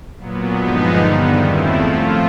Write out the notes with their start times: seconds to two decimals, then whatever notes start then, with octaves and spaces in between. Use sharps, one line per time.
0.17 A#2 F#3 B3
0.58 G2 D3 F3 G#3 B3 D#4
0.98 G2 D#3 G3 B3
1.38 E2 C#3 F3 A3 C4 E4
1.78 A2 F3 A3 F4